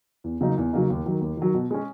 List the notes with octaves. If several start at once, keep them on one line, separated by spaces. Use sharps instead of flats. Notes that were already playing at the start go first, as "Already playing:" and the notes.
E2
C#3 F#3 A#3 D#4
E2
C#3 F#3 A#3 D#4
D#2
D#3 F#3
D#2
D#3 F#3
B2
G#3 C#4